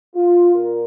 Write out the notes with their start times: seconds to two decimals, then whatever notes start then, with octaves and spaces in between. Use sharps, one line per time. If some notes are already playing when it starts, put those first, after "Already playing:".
0.16 F4
0.55 A#2 A#4